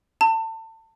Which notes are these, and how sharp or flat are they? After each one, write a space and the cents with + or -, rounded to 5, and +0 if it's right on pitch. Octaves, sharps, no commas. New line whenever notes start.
A5 +30